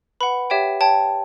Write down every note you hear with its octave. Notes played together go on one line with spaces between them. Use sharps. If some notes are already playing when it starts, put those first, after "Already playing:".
B4 F#5 B5
G4 C#5 E5 G5
C#5 G5 A5